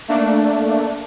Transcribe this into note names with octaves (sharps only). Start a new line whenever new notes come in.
A3 A#3 D4